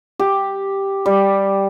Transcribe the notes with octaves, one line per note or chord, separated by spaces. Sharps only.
G4
G3